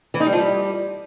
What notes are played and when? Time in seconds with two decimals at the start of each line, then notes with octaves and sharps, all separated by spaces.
0.14 E3
0.20 D#4
0.26 G3
0.33 F3
0.39 G3